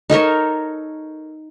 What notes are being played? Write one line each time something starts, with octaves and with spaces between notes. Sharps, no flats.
D#4 A4 A#4 C#5